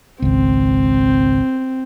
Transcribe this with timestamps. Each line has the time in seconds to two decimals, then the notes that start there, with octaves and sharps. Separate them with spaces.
0.22 G#1 C#2 C4